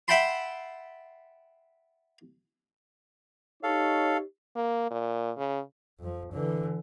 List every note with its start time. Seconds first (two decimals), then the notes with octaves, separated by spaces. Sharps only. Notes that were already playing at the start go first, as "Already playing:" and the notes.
0.08 E5 F#5 G5 A5 B5 C6
3.63 D#4 G4 A4 C#5 F5
4.56 A#3
4.91 A#2
5.37 C#3
5.99 F2 F3
6.32 D3 E3